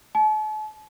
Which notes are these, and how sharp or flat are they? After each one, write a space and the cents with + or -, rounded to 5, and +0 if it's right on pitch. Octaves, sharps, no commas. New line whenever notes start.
A5 -40